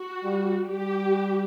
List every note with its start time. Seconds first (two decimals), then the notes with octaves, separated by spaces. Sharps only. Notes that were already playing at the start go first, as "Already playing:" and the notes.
Already playing: F#4
0.24 G3
0.70 G3 G4